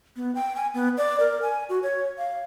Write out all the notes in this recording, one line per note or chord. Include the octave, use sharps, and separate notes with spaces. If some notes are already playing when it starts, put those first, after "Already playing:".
B3
G5
G#5
B3
D5
A#4
G#5
F#4
C#5
F5